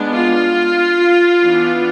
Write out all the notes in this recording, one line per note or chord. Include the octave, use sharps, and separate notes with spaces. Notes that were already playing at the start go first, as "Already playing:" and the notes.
Already playing: G#3 B3 D4
F4
E3 B3 D4